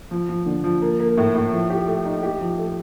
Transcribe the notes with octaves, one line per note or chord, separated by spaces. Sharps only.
F3
F3
D3
F3
A#3
A#3
A2
A2
F3
G4
A3
D#4
G4
F3
A3